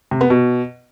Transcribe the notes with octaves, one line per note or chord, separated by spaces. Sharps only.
C3
B3
B2